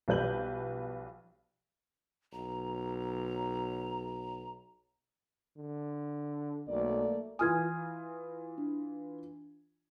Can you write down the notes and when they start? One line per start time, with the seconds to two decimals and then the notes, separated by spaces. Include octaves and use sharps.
0.08 B1 F3 G3 B4 G6 F#7
2.33 B1 A#5
5.57 D3
6.69 B1 A3 A#3 D5
7.39 E3 F4 G#5 D#6 F6 G#6
8.58 D4